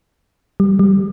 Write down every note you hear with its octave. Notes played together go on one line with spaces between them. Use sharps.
G3
G3